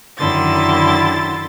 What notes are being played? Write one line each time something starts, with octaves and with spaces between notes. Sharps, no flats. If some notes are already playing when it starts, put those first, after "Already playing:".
F#2 D3 D#3 E4 C6 A6